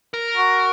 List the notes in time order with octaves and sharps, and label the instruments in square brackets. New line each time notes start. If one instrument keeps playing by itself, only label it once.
[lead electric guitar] A#4
[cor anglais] F#4